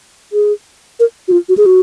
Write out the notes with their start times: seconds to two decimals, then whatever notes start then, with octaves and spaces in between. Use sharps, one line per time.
0.33 G#4
1.00 A#4
1.28 F#4
1.32 F4
1.49 F#4
1.57 G#4
1.66 F#4